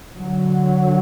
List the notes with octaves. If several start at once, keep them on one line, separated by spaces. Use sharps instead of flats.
D3 F#3